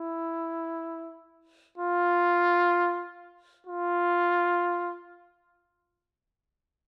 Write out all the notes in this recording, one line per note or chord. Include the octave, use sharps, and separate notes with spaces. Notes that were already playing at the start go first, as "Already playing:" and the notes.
Already playing: E4
F4
F4